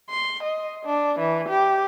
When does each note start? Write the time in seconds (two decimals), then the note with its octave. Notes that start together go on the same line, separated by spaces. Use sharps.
0.10 C6
0.43 D#5
0.85 D4
1.19 E3
1.49 G4